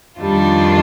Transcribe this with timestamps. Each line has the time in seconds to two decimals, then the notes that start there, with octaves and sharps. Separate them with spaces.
0.21 F2 D#3 G3 D4 F4